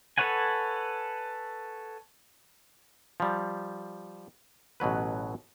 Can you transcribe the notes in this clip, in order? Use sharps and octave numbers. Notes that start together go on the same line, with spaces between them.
A4 B4 C#5 F#5 G#5
F3 G3
A1 B2 F#3 B4